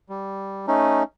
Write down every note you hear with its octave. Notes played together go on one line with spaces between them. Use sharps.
G3
A3 C#4 D#4